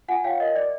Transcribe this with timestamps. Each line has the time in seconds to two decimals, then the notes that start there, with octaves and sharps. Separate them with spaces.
0.08 F4 F#5 G#5
0.24 C#5 F5 G5
0.40 A#4 D#5
0.56 D5